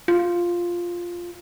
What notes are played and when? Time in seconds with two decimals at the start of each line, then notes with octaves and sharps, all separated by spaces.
0.08 F4